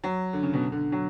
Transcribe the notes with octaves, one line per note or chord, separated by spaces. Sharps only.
F#3
D3
C#3
B2
D3
F#3